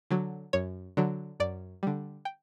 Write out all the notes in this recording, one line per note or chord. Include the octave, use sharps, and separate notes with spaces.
D3 F#3
F#2 C#5
D3 F#3
F#2 D5
D3 G3
G5